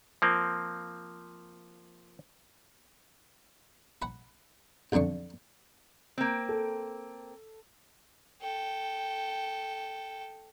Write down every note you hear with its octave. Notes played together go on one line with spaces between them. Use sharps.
F3 A#3 C4
F#5 B5
B1 F2 D3 D4 C#6
A#3 C4
A4
A4 G5